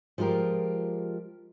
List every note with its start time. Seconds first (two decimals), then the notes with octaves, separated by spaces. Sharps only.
0.18 F3 G#3 F4 G4 A#4